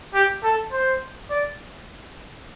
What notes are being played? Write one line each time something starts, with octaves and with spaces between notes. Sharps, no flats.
G4
A4
C5
D5